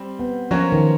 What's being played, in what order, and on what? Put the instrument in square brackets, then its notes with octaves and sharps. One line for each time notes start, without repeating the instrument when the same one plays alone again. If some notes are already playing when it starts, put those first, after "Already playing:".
Already playing: [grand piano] G3 C4
[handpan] B3
[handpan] F3 [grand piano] F#3 A#3 C#4 F#4
[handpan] D#3